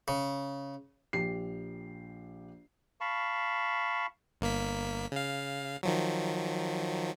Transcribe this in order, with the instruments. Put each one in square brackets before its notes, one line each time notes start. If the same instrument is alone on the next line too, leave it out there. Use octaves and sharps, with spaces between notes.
[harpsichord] C#3
[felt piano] A#1 G4 C7
[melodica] F5 A5 B5 C#6
[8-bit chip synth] G1 A#3 B6
C#3 F5
D#3 F3 F#3